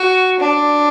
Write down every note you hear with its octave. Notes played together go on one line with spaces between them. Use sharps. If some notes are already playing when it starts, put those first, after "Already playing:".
Already playing: F#4
D4